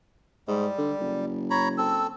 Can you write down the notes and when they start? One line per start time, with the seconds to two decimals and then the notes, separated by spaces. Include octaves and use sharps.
0.48 G#2 G3
0.78 D3
1.01 F#1
1.50 C#5 A#5 B5
1.78 C4 A4 E6